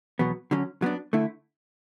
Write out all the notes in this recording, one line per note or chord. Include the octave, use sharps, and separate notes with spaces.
E2 B2 F#3 B3
D3 F#3 C#4
F#3 B3 D4
D3 A3 E4